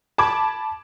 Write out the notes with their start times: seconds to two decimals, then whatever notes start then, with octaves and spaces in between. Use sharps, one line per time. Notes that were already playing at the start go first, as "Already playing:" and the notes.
0.18 A5 B5 D6 G#6